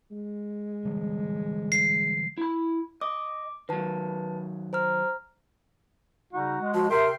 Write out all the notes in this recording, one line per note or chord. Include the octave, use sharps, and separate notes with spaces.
G#3
D3 E3 G3
C7
E4 B5
D#5 D6
D#3 F#3 B4 A5
C5 A#5 F6
C#3 G3 D#4 F#4
G#3
F3 F#4
C3 A#4 E5 G5 C6